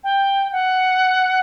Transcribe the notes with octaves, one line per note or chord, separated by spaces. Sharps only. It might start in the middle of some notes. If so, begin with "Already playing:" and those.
G5
F#5